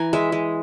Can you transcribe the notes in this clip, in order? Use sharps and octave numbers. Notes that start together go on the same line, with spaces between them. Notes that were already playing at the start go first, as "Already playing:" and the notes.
Already playing: E3 G#5 A#5
G#3 E5
G#3